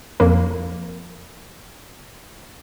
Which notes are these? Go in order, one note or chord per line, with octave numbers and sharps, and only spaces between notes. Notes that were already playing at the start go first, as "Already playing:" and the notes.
F2 A#3